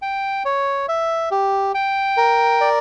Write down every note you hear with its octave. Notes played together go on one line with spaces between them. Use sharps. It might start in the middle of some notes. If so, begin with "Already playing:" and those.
G5
C#5
E5
G4
G5
A#4
D5